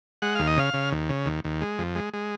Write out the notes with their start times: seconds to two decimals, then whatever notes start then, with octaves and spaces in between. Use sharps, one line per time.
0.22 G#3 F#5
0.35 D#2 F5
0.47 D#5
0.57 C#3 F5
0.74 C#3
0.92 D#2
1.09 C#3
1.26 D#2
1.44 D#2
1.61 G#3
1.78 F2
1.95 G#3
2.13 G#3